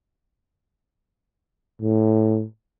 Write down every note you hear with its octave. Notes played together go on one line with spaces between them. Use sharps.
A2